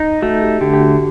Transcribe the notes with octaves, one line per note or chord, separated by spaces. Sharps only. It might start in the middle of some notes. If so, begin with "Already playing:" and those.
Already playing: D#4
A3 F#4
G4
D3 G4
G4
F#4